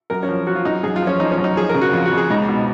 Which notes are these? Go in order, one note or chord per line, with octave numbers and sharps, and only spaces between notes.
F#2 A#4
C#4
F3
F3 F#4
F4
F#2 D#4
F#2 G#4
F4
F3
C#4
F3 D#4
C#4
F#2
D#4
F3 G#4
A#4
C#3
F#4
F2 F4
F#4
F2
G#4
C#2 D#4
B2